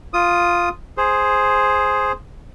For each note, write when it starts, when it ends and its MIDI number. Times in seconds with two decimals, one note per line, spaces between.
0.14 0.69 65
0.14 0.69 87
0.97 2.12 68
0.97 2.12 72